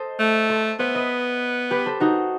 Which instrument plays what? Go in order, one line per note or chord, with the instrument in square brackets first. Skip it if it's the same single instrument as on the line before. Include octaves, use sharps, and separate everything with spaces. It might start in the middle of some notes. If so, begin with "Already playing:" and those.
Already playing: [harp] A4 C5 D#5
[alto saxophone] A3
[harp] A4 C5
[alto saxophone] B3 [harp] C5 E5
[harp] B4 D#5
G4 B4
A4 C5
D#4 F#4